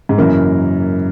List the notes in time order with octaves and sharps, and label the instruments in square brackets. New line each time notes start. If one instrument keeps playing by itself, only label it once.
[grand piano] G#2
[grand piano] F#2 [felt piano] C#3 E3 A#3 E4 A#4